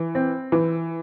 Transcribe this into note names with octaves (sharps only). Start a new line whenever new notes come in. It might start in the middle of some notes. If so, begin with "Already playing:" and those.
Already playing: E3
C4
E3